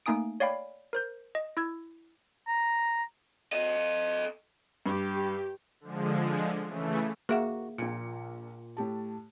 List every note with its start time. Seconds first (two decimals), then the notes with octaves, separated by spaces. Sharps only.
0.06 A3 A#3 D#4 G#5 D#6 D7
0.40 C#5 D5 F5 G5 B5
0.93 A#4 C5 G6
1.35 D#5
1.57 E4 E6 G#6
2.48 A#5
3.53 A4 D#5
4.86 G2 G4
5.81 D3 F3 G#3
6.67 C#3 E3 A3
7.29 A#3 F#4 G#4 E5 F#5
7.78 A#1 A#2 C#7
8.77 A2 G4 A5